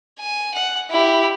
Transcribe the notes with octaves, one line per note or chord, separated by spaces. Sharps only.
G#5
F#5
E4 G4